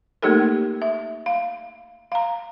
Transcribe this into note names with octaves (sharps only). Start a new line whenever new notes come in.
A3 A#3 D#4 G4 A4 A#4
E5
F5
F5 A#5